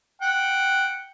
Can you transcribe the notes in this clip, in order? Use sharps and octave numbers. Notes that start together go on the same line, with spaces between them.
F#5 G5